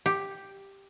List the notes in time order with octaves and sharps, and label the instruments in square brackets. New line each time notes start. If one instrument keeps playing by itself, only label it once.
[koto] G4